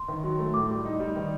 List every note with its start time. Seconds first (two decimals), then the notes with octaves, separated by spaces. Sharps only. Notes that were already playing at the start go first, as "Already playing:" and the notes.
Already playing: C6
0.08 D#3
0.24 F#3
0.39 A3
0.54 A2 D6
0.70 G3
0.85 D#4
1.00 G3
1.16 D#3